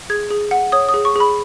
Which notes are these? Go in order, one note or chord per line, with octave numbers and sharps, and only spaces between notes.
G#4 G#6
G#4
F#5
C#5 D#6
D#6
G#4
C#6
G#4 B5